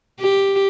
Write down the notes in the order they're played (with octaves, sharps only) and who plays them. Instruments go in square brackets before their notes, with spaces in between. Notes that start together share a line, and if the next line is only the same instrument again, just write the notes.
[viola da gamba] G4